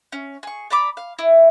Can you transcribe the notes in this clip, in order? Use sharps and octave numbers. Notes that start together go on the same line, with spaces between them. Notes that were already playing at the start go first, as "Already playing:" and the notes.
C#4
G#4 C#6
D5 A#5 B5 D6
F5
E4